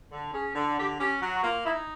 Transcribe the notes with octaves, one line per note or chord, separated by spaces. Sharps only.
D3
C#4 G#4
D3
D3 G4
C#4 G4
F#3 F#4
F#4
A#3 F4
D#4 E4